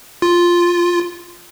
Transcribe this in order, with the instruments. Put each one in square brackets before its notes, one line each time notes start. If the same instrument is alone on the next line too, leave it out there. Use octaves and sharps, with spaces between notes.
[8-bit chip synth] F4